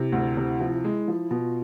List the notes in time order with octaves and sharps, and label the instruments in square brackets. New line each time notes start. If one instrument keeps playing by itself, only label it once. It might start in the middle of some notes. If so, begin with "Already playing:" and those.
Already playing: [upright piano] C3 [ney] E4
[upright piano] D2
C3
F3
G#3
F3
[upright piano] B2 [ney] F4